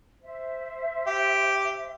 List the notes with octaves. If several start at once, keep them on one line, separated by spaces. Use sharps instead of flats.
C5 E5
G4